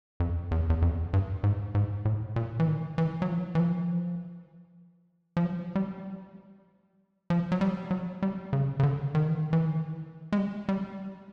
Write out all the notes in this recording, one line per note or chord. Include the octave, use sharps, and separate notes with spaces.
F2
E2
E2
F2
G2
G#2
G#2
A2
A#2
E3
D#3
E3
F#3
F3
E3
F3
F3
F#3
G3
F3
F#3
G3
F#3
G3
C#3
C#3
D3
D#3
E3
D#3
E3
D#3
G#3
G3
G3